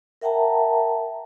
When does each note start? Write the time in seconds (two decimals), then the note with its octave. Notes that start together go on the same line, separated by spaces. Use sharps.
0.21 A#4 E5 F#5 G5 A5 A#5